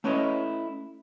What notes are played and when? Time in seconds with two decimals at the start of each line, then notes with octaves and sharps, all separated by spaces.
0.04 A3 C#4 E4 B4 C#5 D#5